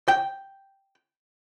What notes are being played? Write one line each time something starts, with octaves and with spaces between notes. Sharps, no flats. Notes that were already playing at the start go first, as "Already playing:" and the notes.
G5